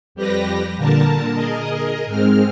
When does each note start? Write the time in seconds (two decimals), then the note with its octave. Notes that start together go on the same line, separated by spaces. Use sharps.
0.15 F2 G3 G4 B4 A#6
0.77 A#2 D3 A#4 A5
1.34 G#4 A#4 D#5
2.05 G#2 G#3 C4 F6